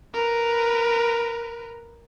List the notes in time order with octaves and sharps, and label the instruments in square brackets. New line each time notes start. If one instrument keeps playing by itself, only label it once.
[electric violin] A#4 B4